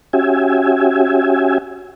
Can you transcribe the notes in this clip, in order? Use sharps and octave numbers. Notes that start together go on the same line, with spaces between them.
C#4 F#4 G4 E5 G#5